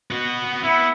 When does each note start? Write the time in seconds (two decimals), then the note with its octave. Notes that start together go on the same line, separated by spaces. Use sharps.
0.11 B3 F#4
0.64 B3 E4